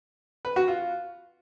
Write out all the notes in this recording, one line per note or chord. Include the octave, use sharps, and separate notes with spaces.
B4
F#4
F4